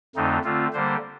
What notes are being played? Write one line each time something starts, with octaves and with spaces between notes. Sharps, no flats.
F2 D3 A3 C4 D#4
D3 A3 C4 F4
D3 G3 A#3 C5